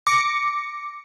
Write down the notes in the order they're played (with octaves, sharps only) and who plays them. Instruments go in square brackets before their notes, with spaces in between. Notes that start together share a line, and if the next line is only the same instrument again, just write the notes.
[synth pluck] D6 A#6 C#7